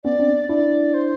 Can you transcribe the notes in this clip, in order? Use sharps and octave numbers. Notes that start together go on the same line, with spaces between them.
B3 C#4 D5
C4 D4
D4 E4 D5
C5